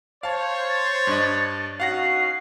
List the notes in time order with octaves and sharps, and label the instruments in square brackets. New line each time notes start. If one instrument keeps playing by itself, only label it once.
[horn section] C5 [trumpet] C#5 [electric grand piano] F5 A5
[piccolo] A6
[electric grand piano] G2 D4 D#5
[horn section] C#4 D#4 F#4 [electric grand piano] F5 F#5 A#6 [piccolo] C7